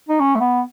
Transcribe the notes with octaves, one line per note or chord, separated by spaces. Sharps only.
D#4
C#4
A3
B3